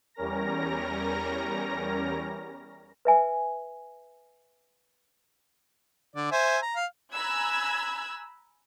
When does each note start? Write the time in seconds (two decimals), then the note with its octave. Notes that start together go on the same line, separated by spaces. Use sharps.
0.15 E2 G3 C#4 A#4 A#5 A#6
3.05 B4 E5 G#5
6.16 D3 D5
6.32 C5 E5 G#5
6.62 A#5
6.76 F5
7.13 G#5 A#5 B5 E6 F#6 G#6